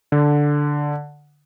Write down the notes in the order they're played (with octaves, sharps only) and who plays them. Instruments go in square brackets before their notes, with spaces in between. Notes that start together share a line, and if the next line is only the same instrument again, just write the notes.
[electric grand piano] D3